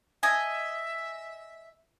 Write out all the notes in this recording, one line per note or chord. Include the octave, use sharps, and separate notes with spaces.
D#5 E5 G#5